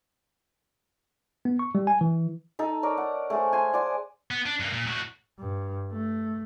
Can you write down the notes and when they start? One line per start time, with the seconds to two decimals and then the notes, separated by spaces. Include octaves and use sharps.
1.45 B3
1.59 C#6
1.75 G3
1.87 G#5
2.01 E3
2.59 D#4 A4
2.83 A#4 C#5 D5 A#5
2.97 F#5
3.30 A3 G#4 C5
3.53 G#5 C6
3.74 D5 F#5 C6
4.31 B3
4.46 D4
4.60 G2 A#3
4.73 A#2
4.87 A2 F#4
5.39 G2
5.93 A3